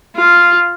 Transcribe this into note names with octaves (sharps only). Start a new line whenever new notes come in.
F4